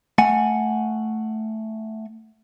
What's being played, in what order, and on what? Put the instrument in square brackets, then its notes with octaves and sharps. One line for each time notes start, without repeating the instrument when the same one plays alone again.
[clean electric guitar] A3 F#5 G#5